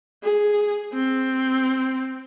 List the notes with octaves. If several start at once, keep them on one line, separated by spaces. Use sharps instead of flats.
G#4
C4